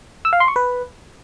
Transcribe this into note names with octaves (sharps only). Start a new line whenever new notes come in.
E6
F5
C6
C#6
B4